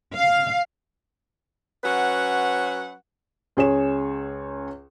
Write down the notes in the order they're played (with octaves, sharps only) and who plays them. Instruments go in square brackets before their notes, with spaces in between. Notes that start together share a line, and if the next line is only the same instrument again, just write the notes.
[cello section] F5
[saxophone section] F#3 C#4 B4 F#5
[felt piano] C#2 G#4 C#5 E7